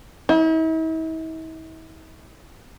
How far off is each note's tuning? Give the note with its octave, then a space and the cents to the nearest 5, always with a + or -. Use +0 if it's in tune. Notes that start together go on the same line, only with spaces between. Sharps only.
E4 -45